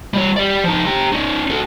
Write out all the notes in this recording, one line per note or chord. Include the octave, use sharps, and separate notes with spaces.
G3 C#5
G4 D5
F3 D#4
G4 A#5
C#4 D#4
F#4 A4